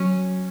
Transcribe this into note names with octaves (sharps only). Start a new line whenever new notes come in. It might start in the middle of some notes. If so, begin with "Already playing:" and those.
Already playing: F#3 C#4